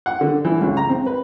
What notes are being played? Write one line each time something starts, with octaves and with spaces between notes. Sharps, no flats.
F#5
D3
E3
C#2
A#5
C4
B4